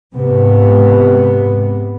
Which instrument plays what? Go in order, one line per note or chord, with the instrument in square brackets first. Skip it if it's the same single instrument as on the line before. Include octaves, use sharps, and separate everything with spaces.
[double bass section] G#2 C3 B3